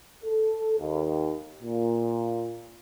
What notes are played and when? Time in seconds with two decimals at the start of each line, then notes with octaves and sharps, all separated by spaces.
0.24 A4
0.79 D#2
1.62 A#2